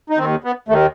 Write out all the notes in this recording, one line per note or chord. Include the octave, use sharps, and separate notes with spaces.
D#4
D#2 D#3 C4
B3
D#2 D#3 A3